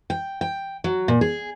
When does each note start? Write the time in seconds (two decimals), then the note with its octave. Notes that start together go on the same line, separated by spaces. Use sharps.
0.10 G5
0.41 G5
0.84 F#3
1.08 A#2
1.21 G#4